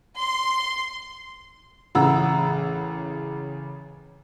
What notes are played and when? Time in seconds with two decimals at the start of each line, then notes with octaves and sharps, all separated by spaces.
0.18 C6
1.95 A1 C#3 F#5 A#5 E6